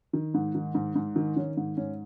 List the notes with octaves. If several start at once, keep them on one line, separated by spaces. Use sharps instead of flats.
D#3
G#2
D#3
G#2
G#2
D#3
D#3 C#4
G#2
G#2 C#4